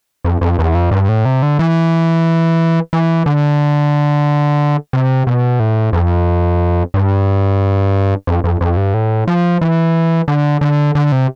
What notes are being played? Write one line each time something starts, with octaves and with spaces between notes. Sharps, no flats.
F2
F2
E2
F2
G2
A2
C3
D3
E3
E3
D3
C3
B2
A2
F2
G2
F2
F2
F2
G2
A2
F3
E3
D3
D3
D3
C3